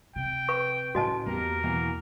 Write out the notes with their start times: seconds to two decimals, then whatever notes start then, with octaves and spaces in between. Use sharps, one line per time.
0.16 C3 G5
0.49 B4 C#6
0.95 A2 C#4 F#4 D#5 A5
1.26 E2 A#3 G4 A#4
1.63 B2 E3 A#3